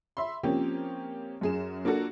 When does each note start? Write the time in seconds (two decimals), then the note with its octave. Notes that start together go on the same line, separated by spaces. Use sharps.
0.17 E5 B5 C6
0.43 F3 A#3 C4 C#4 G4
1.41 F#2 G#4 E7
1.85 A#3 D4 F4 F#4 A4